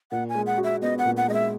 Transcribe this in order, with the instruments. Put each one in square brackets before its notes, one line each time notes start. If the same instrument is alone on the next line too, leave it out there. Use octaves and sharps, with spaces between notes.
[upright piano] A#2 [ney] F#5
[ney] G#5
[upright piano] G#3
[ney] F#5
[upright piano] F#4
[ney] E5
[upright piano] B3 [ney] D#5
[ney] F#5
[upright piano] A#2
[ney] F#5
[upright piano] G#3 [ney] D#5
[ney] E5